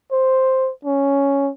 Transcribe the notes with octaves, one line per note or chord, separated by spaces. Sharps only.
C5
C#4